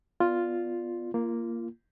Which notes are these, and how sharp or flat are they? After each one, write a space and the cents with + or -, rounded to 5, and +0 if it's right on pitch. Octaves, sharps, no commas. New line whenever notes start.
B3 +0 F4 +0 D5 +15
A#3 +0 F4 -30